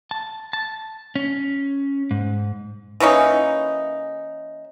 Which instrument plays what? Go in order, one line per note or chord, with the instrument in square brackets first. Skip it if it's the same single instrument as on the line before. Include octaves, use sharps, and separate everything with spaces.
[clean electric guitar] A5
A5
C#4
G#2
[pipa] E3 A#3 C#4 D#4